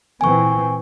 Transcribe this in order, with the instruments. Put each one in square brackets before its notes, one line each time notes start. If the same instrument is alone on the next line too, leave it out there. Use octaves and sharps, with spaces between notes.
[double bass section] A#2 E3 C4 [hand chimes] G#5 C#6